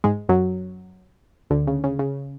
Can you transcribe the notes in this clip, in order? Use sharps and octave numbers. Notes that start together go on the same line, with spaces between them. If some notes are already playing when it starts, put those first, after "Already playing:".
G#2 G#3
F#2 F#3
D2 D3
C#3
C#3
C#3